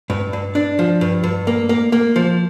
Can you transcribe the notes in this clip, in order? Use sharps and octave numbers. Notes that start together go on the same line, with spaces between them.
G2
G2
D4
F3
G2
G2
A#3
A#3
A#3
F3